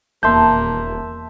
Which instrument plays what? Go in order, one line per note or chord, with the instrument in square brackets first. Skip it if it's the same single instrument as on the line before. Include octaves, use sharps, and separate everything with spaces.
[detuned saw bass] D#1 [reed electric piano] E2 C6 G6 [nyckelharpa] A#3 [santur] E5 A5